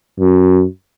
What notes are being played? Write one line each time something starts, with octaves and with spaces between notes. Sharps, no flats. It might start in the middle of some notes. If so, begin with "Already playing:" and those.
F#2